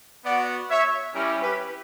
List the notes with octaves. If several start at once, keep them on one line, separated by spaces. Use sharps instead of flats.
B3 F#4 D5 F#5
C#5 E5
G3 C#4 E4 G4 A#4
G4 B4